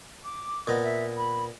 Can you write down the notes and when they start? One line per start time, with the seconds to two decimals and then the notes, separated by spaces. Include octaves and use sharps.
0.24 D6
0.68 A#2 B3 D#5
0.83 E5
1.16 B5